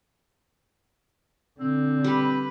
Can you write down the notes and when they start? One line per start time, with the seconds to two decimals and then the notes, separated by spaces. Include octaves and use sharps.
1.60 D3 C4
2.04 G3 B4